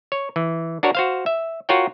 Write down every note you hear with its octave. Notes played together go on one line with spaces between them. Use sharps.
C#5
E3
D4 F#4 A#4 C#5
F#4 C5 F5
E5
F4 F#4 A#4 C#5 F#5 G5